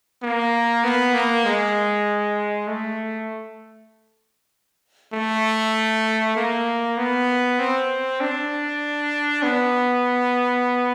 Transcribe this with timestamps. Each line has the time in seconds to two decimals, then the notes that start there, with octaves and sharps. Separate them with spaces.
0.22 A#3
0.84 B3
1.14 A#3
1.45 G#3
2.67 A3
5.13 A3
6.36 A#3
6.97 B3
7.59 C4
8.21 D4
9.43 B3